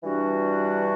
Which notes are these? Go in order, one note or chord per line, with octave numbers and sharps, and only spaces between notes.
G2 E3 G3 D4 F#4